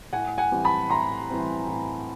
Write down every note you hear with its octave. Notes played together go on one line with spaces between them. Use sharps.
A2 F#5 G#5
F#5 G#5
E3 G3 C4
A5 B5
A2 A#5 C6
E3 G3 C4
A2